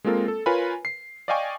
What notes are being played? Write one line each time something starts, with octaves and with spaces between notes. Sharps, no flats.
G#3 A#3 C4 F4 A4 A#4
A4
F4 A#4 B4 C#5 G#5 B5
C7
D5 D#5 F5 G5 G#5 C#6